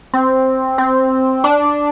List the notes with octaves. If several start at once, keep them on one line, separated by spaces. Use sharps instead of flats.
C4
C4
D4